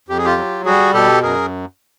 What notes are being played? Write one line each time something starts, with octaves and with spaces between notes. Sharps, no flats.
F2 G4
G#4
F4 G4
F#3
G3 F#4 G#4
B2 G4 A4
F#2 G#4 A#4